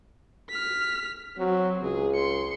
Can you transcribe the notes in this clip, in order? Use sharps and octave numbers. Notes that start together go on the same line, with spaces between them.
F6 B6
F#3 C4 F#4
C#2 G#4
C6 C#7